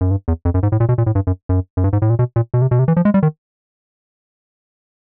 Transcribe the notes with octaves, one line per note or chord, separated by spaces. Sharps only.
F#2
G2
E2
F2
F#2
G#2
A2
A#2
B2
A#2
A2
G2
F#2
F#2
F#2
G2
G#2
A2
A#2
B2
A#2
B2
C3
B2
C3
E3
F3
G#3
G3
D#3